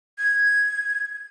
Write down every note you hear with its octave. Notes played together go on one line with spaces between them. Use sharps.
G#6